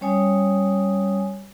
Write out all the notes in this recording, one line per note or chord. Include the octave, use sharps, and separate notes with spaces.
G3 C#4 C#5 G#5 D#6